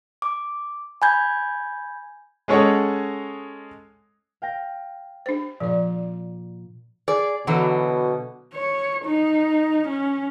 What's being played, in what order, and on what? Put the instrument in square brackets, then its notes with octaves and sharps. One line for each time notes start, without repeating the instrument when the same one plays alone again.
[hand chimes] D6
G#5 B5 G6 G#6
[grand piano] G#3 C#4 A4 C#5 D#5 F#5
[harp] F5 G5 A#6
[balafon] D4 C5
[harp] A#2 [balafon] F3 D5
[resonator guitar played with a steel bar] G#4 D5
[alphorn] B2 [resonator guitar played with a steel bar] D3 E3 F#3
[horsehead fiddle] C#5
D#4
C#4